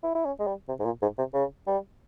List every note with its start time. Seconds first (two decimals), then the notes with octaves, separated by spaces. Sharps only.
0.03 E4
0.15 E4
0.25 C#4
0.39 G#3
0.47 G3
0.68 C3
0.80 G#2
0.85 A#2
1.02 G#2
1.18 C3
1.34 C#3
1.67 G3